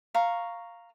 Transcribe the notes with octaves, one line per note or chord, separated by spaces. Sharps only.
F5 A#5 C#6